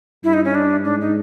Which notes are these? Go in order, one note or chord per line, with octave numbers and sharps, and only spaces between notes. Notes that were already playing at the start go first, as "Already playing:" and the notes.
G2 E4
D#4
C#4
D4
G#2 D4
D#4